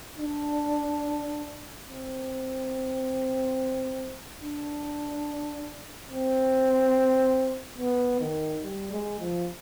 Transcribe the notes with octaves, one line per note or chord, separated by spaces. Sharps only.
D4
C4
D4
C4
B3
D#3
G3
G#3
F3